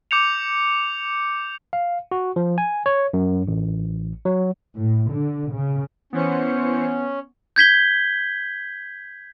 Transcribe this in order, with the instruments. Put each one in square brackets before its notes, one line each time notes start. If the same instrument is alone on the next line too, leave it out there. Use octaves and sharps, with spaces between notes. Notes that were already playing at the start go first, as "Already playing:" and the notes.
[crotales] D6 G6 C#7 F7
[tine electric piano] F5
F#4
F3
G#5
C#5
F#2
A1
F#3
[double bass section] A2
D3
C#3
[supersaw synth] E3 C5 C#7 [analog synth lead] B3 [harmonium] C#4
[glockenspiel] G6 G#6 B6 G7